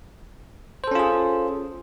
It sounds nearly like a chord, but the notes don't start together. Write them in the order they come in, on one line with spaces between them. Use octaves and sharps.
C5 A4 C#4 F4 G#4